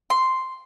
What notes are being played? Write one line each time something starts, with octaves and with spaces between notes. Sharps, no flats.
C6